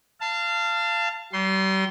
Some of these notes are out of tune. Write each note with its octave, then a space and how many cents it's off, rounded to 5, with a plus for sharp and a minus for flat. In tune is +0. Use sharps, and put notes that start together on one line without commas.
F5 -20 A5 +15
G3 -40 C6 +0